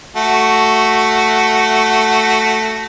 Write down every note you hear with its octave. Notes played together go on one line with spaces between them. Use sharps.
A3 F#4